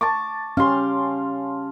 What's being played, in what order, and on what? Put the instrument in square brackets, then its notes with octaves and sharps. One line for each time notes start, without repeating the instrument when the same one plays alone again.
[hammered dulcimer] A5 C#6 D6
[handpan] C#4 G4 [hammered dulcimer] F5 C6